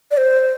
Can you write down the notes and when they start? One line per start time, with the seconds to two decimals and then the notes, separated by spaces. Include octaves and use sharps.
0.11 D5
0.17 C5